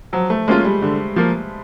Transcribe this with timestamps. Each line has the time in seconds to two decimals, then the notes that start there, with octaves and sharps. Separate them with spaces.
0.13 F3 F#3
0.30 A3
0.48 G#3 A#3 C#4 F4
0.65 G3
0.82 D3
1.16 F3 A#3